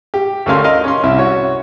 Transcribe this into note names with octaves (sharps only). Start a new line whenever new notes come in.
G4
D2 A3 C#4 A#4 F5 C6
A#4 D#5 F5 C6
C#4 C6
C2 E4 E5
F#4 C#5